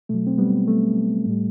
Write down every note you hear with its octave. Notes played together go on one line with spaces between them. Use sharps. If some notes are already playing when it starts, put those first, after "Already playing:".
B2 F#3 A3
C4
G3 B3
A3
A2 G3